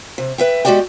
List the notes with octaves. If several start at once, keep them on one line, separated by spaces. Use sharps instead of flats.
C3
B4 E5 G5
G#3 B3 F#4 G4 D5 G5